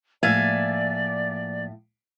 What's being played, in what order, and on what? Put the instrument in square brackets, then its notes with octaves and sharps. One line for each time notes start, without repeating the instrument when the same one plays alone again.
[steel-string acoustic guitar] A2 E5 F5 [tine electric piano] F3 A#3 A6 [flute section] D5 [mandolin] G#5